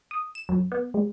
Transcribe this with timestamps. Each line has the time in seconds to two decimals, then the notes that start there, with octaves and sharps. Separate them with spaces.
0.11 D#6
0.35 E7
0.49 F#2
0.72 B3
0.94 G#3